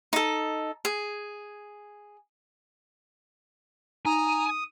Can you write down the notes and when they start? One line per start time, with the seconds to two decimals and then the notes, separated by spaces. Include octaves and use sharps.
0.13 D#4 A4
0.85 G#4
4.06 D#4 G#5 A#5 D#6